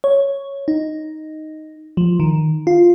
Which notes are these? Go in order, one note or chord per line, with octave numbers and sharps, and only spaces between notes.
C#5
D#4
F3
D#3
F4